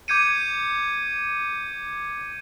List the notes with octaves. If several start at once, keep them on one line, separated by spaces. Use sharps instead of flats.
D6 G6 G#6 C#7 D#7